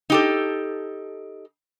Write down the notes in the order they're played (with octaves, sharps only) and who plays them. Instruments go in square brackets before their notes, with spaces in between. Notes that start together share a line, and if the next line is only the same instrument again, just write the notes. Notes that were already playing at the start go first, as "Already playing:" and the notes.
[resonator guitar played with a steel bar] D#4 G4 A4